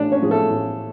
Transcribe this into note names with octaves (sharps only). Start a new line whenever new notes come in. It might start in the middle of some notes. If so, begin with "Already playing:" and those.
Already playing: A1 A2 D4 D5
C#4 C#5
A2 F3 G#4
A3 A4
A1